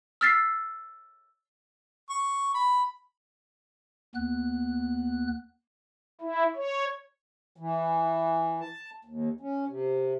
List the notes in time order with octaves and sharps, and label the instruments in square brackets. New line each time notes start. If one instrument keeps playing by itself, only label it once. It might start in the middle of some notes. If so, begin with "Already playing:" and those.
[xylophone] E6 F6 A6 B6 C7
[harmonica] C#6
B5
[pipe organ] D#2 B3 F#6
E4
C#5
[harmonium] E3
A5
D#2
C#4
C3